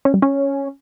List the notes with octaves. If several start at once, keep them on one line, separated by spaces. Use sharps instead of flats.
C#4
G3
C#4